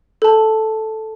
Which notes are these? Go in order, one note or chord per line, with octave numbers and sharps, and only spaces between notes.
A4 A5